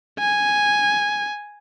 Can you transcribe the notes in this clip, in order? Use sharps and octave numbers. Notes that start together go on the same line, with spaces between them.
G#5